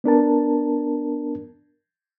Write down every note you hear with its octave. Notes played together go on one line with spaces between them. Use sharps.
B3 D4 A#4 A5